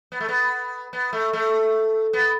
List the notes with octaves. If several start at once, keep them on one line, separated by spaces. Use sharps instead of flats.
B3
A3
B3
B3
A3
A3
B3